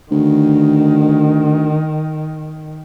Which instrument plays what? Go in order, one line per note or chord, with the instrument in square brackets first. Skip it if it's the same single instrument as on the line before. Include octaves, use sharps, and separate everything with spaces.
[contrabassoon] D2 [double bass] D#3